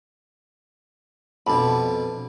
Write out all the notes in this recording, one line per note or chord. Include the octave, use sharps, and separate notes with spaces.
F2 B2 D4 A5 B5